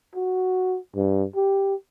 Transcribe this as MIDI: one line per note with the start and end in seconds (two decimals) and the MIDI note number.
0.15 0.77 66
0.96 1.25 43
1.36 1.75 67